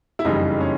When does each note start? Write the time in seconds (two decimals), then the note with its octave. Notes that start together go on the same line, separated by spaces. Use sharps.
0.19 E4
0.24 F#1 F2 C#3 E3 G3 D#4
0.60 C#4